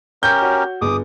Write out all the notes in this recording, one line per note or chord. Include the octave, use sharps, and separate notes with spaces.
C#4 G4 A#4 G6
F#4 C#5
G1 G#4 D6 D#6